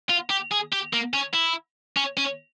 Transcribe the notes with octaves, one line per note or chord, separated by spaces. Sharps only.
F4
G4
G#4
G4
A#3
C#4
E4
C#4
C#4